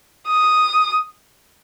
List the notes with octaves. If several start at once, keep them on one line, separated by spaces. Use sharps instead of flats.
D#6